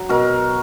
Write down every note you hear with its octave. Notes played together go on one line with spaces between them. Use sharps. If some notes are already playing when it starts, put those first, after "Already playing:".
Already playing: F#3
B2 F#4 A#4